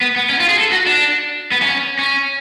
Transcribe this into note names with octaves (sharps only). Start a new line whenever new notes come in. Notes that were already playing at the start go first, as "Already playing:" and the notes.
B3
B3
C#4
F4
G#4
A4
F#4
D4
B3
C#4
C#4